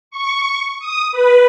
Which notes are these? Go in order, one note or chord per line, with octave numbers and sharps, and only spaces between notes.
C#6
D#6
B4